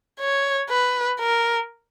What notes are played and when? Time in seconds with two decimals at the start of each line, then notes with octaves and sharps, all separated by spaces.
0.20 C#5
0.70 B4
1.20 A#4